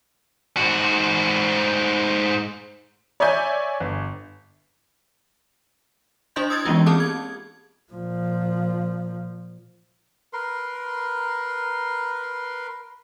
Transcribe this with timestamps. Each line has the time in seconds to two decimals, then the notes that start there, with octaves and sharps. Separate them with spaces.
0.57 G#2 F#4
3.20 C#5 D5 E5 G#5 G6
3.80 G1
6.36 D4 E4 C5 D#5 C6 G6
6.50 D#6 E6 G#6 A6
6.65 E3 G#3 A#3 B3 C#4 F4
6.86 C4 G4 G#4 A5 D6 D#6
7.00 G#6
7.92 A#2 F3
10.33 A#4 B4 C6